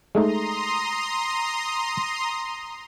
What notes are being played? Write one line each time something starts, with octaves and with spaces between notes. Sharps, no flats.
G#3 A3 D#4 A#5 C6 D#6